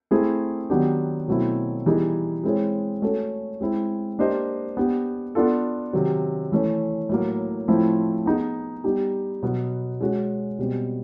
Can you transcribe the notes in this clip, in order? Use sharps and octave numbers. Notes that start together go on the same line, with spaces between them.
A3 C4 E4 G#4
D#3 F#3 B3 D4 G4
B2 F#3 A3 C4 E4
E3 G3 B3 D#4 G#4
G#3 C4 E4 G#4 C#5
A3 C#4 F#4 A4 C#5
G#3 C4 E4
A#3 D4 G4 C5 D#5
B3 D4 G4
B3 D4 F4 A4
C3 D#3 F#3
E3 A3 C#4
A2 F#3 A#3
A2 F3 A3 C4 E4
B3 D#4 G#4
G3 B3 D#4 G4
B2 F#3 B3
G#3 C#4 F#4
B2 G3 C4